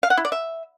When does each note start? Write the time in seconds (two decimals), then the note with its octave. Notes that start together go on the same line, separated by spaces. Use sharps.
0.03 F5
0.10 F#5
0.17 E4
0.25 D5
0.32 E5